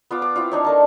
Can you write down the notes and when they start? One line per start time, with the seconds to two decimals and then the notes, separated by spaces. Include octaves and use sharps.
0.11 B3 F4 D6
0.22 D6
0.36 C4 E4 F4
0.51 D4 D#4 C#5
0.65 A3 A#4 A5